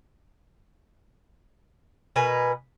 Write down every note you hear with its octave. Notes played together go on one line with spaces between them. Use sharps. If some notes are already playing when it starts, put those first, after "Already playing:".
B2 A#4 B4 G#5